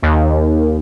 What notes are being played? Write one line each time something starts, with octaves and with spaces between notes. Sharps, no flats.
D#2